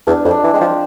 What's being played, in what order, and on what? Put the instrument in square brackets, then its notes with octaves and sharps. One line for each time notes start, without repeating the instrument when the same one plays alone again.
[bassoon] E2 [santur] D4
[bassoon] F2
[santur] D4
[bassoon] E3
[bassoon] G#3 [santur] C4
[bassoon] F3